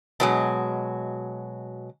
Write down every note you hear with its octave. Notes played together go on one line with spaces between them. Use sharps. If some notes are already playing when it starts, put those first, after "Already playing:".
B2 F#3 G#3